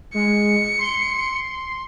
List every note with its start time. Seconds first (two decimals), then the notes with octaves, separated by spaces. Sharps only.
0.14 G#3 C#7
0.79 C6